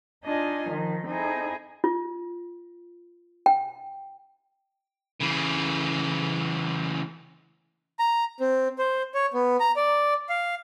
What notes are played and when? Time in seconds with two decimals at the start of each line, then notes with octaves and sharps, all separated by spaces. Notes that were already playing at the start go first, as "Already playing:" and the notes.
0.25 D4 D#4 F4 D#5 G#5
0.69 D#3 F3
1.08 C4 D#4 E4 G#4 A4
1.84 F4
3.46 G5
5.21 C#3 E3
7.99 A#5
8.40 C4
8.79 C5
9.14 C#5
9.34 B3
9.60 A#5
9.76 D5
10.29 F5